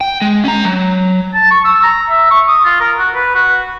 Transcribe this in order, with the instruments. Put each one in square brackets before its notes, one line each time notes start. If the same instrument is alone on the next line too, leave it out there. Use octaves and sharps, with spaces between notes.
[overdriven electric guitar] G5
G#3
C#4 A#5
F#3
[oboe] A5
C#6
E6
A#5
E5
C#6
D#6
F4
A#4
F#4
B4
F#4